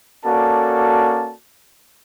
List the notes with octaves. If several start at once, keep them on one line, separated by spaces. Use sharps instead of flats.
A#3 C#4 F#4 A4 D5 A5